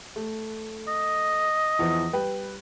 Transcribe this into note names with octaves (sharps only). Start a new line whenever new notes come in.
A3
D#5
E2 E3 F3
G3 B4 G5